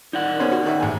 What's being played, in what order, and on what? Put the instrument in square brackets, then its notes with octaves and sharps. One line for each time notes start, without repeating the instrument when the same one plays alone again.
[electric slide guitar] D#4 D5 F#5
[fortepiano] B3 C#4 C5
F#4
D#3 E5
A1 G#5